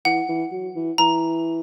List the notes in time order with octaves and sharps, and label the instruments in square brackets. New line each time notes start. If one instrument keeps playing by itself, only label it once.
[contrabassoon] E3 [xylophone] F#5
[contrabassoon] E3
F#3
E3
[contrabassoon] E3 [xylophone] A#5